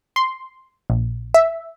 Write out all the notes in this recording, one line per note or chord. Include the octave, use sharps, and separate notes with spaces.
C6
A#1
E5